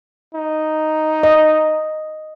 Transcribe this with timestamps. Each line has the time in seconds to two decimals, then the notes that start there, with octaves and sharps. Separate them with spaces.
0.35 D#4
1.23 D#5